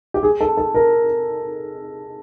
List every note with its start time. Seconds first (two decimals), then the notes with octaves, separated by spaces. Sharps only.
0.14 G4
0.23 G#4
0.41 A4
0.57 A4
0.74 A#4